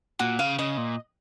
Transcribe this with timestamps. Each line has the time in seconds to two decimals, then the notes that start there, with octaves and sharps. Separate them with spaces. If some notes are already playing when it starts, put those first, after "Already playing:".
0.19 A#2 F#4
0.39 C#3 F5
0.59 C#3 D#5
0.77 A#2